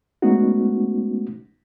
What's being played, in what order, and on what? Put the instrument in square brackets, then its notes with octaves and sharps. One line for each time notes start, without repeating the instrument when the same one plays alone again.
[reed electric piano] G#3 A3 B3 C#4 D#4 F#4